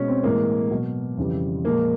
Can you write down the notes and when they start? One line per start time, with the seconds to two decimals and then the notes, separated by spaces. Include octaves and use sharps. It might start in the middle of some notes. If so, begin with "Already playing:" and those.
Already playing: B2 G#3 C#4
0.08 C4
0.23 A2 E3 G#3 A#3
0.71 B2 F#3
1.17 F2 C#3 E3 G3
1.64 A#2 F3 G#3 A#3